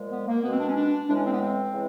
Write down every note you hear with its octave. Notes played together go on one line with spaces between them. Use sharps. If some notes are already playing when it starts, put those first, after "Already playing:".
Already playing: A#2 F3 G#3
B3
A#3
B2 G#3 B3
C4
D4
C#4
D4
A2 E3 G#3 D4
C#4
C4
B3
C4
C#3 E3 G#3